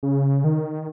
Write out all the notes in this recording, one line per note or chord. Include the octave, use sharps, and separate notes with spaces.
C#3
D#3